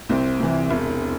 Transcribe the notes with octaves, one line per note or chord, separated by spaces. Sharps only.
C2 C4
C3 E3
E1